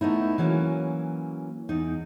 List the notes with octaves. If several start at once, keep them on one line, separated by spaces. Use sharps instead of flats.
A3 B3 D#4 E4
E3 F#3 A#3 C#4
E2 D#4